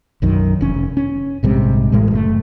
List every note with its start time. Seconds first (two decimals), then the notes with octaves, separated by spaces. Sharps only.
0.22 B1 F#2 D#3
0.61 F1 C#4
0.97 C#4
1.43 A#1 G#2 C3 G3
1.92 A1 A2 G#3
2.11 F#1 C#3 A3